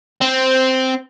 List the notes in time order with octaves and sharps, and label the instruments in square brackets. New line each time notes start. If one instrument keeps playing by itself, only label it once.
[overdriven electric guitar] C4